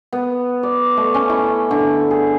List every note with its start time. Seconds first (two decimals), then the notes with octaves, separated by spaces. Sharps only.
0.13 B3
0.63 D5
0.97 A3
1.14 C#4
1.29 E4
1.71 D3
2.11 G#4